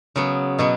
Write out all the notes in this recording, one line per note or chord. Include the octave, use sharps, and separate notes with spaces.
C#3 F#3 B3
B2 F#3 B3